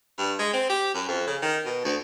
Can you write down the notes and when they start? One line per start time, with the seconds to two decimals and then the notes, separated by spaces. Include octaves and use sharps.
0.18 G2
0.39 G#3
0.53 C4
0.69 G4
0.94 F#2
1.08 F2
1.27 C#3
1.42 D#3
1.66 B2
1.85 D2